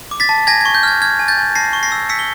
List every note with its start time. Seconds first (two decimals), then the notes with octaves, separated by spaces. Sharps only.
0.11 D6
0.20 A6 B6
0.29 A5
0.47 G#5 G#6 A#6
0.61 G#6
0.65 C#6
0.75 G6
0.83 F6 G#6
1.02 F6 G#6
1.19 G#5
1.28 G6 A6
1.37 G#5
1.55 A5 A#6 C7
1.73 C#6
1.83 A#6 C7
1.92 E6
2.09 E6 B6 C#7
2.19 G7